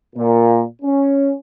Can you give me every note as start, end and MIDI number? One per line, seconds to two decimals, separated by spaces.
0.16 0.62 46
0.82 1.30 61